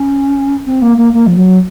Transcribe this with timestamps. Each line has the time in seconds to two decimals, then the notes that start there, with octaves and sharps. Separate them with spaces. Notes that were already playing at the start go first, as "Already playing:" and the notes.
Already playing: C#4
0.66 C4
0.82 A#3
0.97 A#3
1.13 A#3
1.26 F3
1.36 F#3